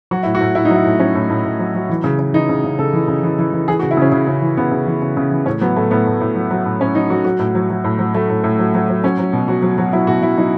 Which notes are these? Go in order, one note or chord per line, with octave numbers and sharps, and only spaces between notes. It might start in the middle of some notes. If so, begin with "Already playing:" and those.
F#3 F#4
A2 E4
F#4
A2
A2 E4
D#4
F#3
E4
A2
F#3 C#4
A2
A2
A2
F#3
F#3
E3
C#3
C#3
E3 D#4
C#3
C#3
C#3 A4
E3
C#3
E3
E3
E3
E3 G#4
F#4
C#3
E4
C#3 C#4
C#3
C#3
E3
C#3 B3
C#3
E3
C#3
C#3
E3
A2 C#4
F#3 B3
A2 A3
A2 B3
A2
A2
F#3
F#3
A2
A2 C#4
F#3 D#4
F#3 F#4
F#3 F#4
A2
F#3
F#3
A2
F#3
F#3 A3
A2
A2
F#3
F#3
F#3
F#3 C#4
F#3
B2
F#3 F#4
F#3
F#3
F#3 E4
B2 F#4
F#3 E4
F#3 D#4